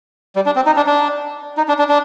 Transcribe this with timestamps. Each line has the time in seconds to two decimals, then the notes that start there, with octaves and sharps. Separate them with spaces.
0.36 G3
0.46 D4
0.56 C4
0.66 D#4
0.76 D4
0.87 D4
1.57 D#4
1.68 D4
1.79 D4
1.89 D4